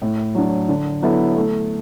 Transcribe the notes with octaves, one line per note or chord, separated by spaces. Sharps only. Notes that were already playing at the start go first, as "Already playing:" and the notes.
A2
F#3 D4
D3
F#3 B3 E4 A4
A3